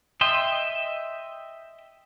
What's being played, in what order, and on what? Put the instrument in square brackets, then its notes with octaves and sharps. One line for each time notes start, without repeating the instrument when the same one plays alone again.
[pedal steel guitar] D#5 E5 G5 C6